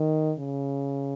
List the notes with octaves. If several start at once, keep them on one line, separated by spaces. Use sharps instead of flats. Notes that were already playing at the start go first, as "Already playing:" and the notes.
Already playing: D#3
C#3